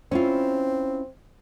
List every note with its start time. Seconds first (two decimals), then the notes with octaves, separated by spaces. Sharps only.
0.12 C4 C#4 E4 F4